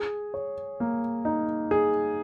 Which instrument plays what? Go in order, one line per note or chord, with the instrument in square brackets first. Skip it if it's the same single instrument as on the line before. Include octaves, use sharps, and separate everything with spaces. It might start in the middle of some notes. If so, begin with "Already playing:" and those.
Already playing: [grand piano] G#4
C#5
A#3
D#4
G#4